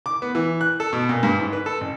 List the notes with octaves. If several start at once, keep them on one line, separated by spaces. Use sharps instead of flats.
D6
B3
E3
F#6
A4
B2
A#2
G2
G#2
B4
A4
A1